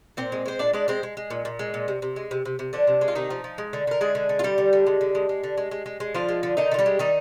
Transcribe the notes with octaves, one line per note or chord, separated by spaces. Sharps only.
A#2 C4 C5
G#3
G#3 C5
A#2 D4 D5
G#3 D4 D5
G#3 C4 C5
G#3
G#3
A#2
A#2
G#3
A#2
C3
C3
G#3
C3
C3
C3
D3 F3 D4
C3
G#3
F4
C3 D#3 D#4
F3
F3
G#3
D3
D3 A#4
D3 G#3 G#4
D3
D3
F4
D3 G3 G4
D3
D3
G#3
D3
G#3
G#3
D3
G#3
G#3
G#3
G#3
D3 F3 F4
G#3
D3
D3 D#3 D#4
D3 F4
G3 G4
G#3
D#3 G3 D#4